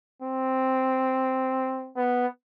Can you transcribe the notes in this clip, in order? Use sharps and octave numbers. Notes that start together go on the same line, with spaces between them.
C4
B3